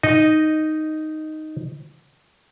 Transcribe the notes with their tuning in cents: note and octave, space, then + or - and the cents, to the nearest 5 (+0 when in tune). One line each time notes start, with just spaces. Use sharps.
D#4 +0 D#5 -10